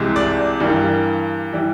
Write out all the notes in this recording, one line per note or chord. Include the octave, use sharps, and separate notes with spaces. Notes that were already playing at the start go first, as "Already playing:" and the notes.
Already playing: C2 C3 E3 G#3
D5
G2 E3 G3 A#3
E3 G3